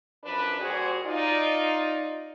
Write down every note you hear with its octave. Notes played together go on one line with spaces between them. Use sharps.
F#2 F3 D4 B4
A#2 G3 F#4 G#4 C5 C#5
D#4 F4 D5